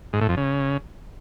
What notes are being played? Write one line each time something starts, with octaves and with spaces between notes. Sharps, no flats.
G#2
A2
F2
C#3